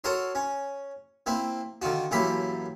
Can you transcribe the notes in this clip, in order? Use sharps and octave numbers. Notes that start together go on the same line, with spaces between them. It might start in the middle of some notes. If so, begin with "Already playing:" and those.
F#4 A4 A#4 C#5 C6
C#4
A#3 C4 E4
D3 D#3 F4 F#4
A1 F#2 A#3 G4 E5 B5